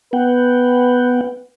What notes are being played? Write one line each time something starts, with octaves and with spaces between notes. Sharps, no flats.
B3 B4 F#5 G5